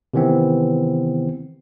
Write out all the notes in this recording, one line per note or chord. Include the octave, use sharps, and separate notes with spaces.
C3 D#3 E3 B3 C4